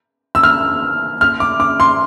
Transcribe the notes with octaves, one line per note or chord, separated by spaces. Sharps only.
E6
F6
F6
D6
D6
C6